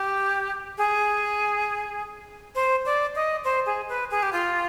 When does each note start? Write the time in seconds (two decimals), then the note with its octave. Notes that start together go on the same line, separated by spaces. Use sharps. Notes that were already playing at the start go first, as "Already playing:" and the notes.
Already playing: G4
0.78 G#4
2.55 C5
2.86 D5
3.15 D#5
3.44 C5
3.66 G#4
3.89 B4
4.11 G#4
4.23 G4
4.33 F4